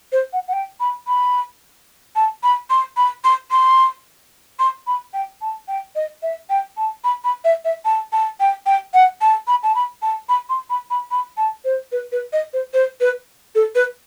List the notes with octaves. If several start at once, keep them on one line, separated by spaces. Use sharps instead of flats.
C5
F#5
F#5
G5
B5
B5
A5
B5
C6
B5
C6
C6
C6
B5
G5
A5
G5
D#5
E5
G5
A5
B5
B5
E5
E5
A5
A5
G5
G5
F#5
A5
B5
A5
B5
A5
B5
C6
B5
B5
B5
A5
C5
B4
B4
D#5
C5
C5
B4
A4
B4